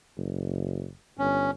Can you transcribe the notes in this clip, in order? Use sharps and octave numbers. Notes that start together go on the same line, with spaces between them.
F#1
G1 C#4